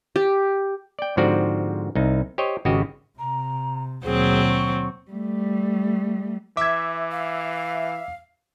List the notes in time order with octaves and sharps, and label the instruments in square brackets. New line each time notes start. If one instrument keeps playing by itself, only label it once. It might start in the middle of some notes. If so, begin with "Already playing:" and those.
[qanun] G4
[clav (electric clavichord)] D5 G5
G#2 D3 F3 C4 F#4 D5
C2 D#4
G4 C5 C#5 D#5
G#1 C#3 F#4 G4 D#5
[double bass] C3 [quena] A#5
[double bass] D#2 B2 [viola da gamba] F#3 C4 [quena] G#4
[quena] C#6
[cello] G3 A3
[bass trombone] E3 [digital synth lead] E5 [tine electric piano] D6 G#6
[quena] F5